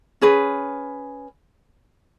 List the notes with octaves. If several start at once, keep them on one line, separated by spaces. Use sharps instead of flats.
C#4 G#4 B4